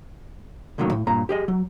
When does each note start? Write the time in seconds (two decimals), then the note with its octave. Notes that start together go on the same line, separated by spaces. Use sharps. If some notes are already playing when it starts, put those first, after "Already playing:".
0.78 C#2 A2 C3 D#3 F#3 A#3
0.92 A2
1.07 G2 A#2 A#5
1.29 G4 G#4 D#5
1.48 F#3